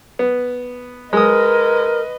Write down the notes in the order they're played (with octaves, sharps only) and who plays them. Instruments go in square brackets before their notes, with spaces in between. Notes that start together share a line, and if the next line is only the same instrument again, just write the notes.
[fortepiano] B3
[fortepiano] G#3 D#6 [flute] A#4 [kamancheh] B4 D#5